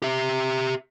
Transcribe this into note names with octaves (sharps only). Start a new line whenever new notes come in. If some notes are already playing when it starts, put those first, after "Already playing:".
G4 E5